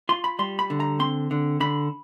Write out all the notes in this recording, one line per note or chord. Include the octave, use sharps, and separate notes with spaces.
F4 C6
B5
G3 C6
B5
D3
A#5
C4 C6
D3
D3 B5